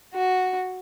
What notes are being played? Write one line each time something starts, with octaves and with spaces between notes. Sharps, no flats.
F#4